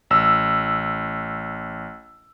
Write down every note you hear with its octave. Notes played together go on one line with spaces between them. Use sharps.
A1 E6